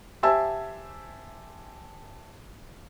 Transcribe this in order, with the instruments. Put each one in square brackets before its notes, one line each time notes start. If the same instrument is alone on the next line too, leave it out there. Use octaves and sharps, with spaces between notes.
[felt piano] G4 C5 E5 G#5 A5 E6